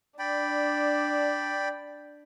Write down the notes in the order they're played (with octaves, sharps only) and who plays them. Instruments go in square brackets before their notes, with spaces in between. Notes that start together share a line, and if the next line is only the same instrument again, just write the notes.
[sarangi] D4 [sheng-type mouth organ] D5 G5 B5